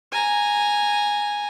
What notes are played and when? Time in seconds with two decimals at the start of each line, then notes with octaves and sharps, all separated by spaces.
0.12 G#5 A#5